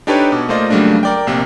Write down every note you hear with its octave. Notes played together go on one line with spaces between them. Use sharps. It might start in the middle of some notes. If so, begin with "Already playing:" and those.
D4 D#4 G4 A4 B4 C#5
B2 D6
A3 A#3 F4 C5 D5 D#5
C#3 F#3 G3 A3 A#3 D4
A#4 D5 G5
A#1 C3 A#3